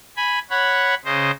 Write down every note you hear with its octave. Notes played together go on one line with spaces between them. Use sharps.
G#5 B5
C#5 F#5 B5
C#3 C5 D#5